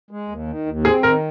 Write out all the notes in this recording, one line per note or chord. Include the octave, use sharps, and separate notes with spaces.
G#3
D#2
D#3
D#2
C4 G#4
D#3 A#4